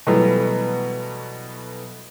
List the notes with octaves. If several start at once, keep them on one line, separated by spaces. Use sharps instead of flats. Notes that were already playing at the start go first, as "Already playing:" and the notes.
B2 E3 F#3 G3 A3 B3